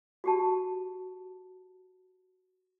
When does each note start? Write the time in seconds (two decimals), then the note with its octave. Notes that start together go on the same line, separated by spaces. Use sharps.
0.24 F#4 G4 A5